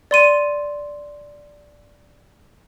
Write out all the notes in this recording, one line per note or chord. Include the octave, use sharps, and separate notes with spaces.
D5 C6 D#7